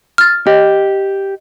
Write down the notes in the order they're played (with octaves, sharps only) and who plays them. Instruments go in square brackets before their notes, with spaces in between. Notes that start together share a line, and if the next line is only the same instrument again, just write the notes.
[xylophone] F6 A6
[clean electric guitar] G4 [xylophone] D#5